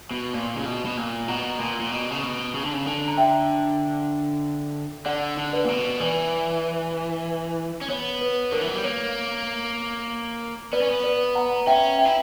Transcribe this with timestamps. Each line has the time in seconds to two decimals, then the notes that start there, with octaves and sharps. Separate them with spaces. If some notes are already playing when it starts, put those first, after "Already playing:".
0.11 B2
0.34 A#2
0.56 C#3
0.65 B2
0.85 B2
0.97 A#2
1.28 B2 F#5 A#5
1.60 A#2
1.80 A#2
1.92 B2
2.11 C#3
2.23 B2
2.55 C#3
2.63 D3
2.73 C#3
2.86 D3
3.08 A#5
3.17 E5 G5
5.06 D3 D5 F#5
5.37 D3
5.53 B4 D5
5.65 A#2
5.69 B2
6.00 E3 B4 D5
7.81 C#4
7.90 B3 C#5
8.21 B4
8.52 D3 A#4
8.61 E3
8.68 F#3
8.76 G3
8.84 A#3 C#5
10.73 B3 B4 D5
10.82 C#4
10.90 B3
11.04 B4 D5
11.35 F#5 A#5
11.67 C#4 E5 G5
11.99 E5 G5
12.05 E4